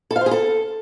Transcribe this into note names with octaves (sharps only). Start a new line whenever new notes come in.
A4
F5
C5
G#4
A4